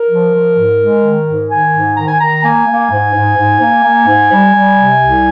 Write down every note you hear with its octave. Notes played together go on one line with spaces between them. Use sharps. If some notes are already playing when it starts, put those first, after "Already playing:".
Already playing: A#4
F3
F3
G#2
G#3
D#3
G#2
D#3 G#5
G#2
D#3 A#5
G#5
D#3 A#5
A#3 G#5
A#3
G#2
G#2
G#2
A#3
A#3
G#2
G3
G3
C3
C2